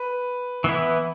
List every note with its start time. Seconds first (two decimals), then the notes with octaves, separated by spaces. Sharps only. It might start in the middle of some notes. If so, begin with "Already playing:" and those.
Already playing: B4
0.64 E3 B3 E4